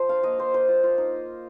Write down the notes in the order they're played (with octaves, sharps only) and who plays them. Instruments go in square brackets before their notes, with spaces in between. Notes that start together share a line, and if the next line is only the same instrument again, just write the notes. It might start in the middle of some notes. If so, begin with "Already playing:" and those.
Already playing: [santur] F3 C5
D4 F5
A#3 D#5
A#3 C5
A#3 C5
F4
F4
D#4